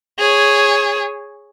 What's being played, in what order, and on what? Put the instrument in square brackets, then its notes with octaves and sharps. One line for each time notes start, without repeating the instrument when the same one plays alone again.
[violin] G#4 C#5